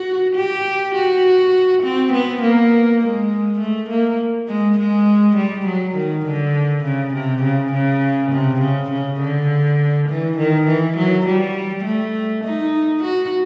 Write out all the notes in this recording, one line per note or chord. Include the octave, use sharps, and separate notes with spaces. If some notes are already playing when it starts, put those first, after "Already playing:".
Already playing: F#4
G4
F#4
C4
B3
A#3
G#3
A3
A#3
G#3
G#3
G3
F#3
D#3
D3
C#3
C3
C#3
C#3
C3
C#3
C#3
D3
E3
D#3
E3
F#3
G3
A3
D#4
F#4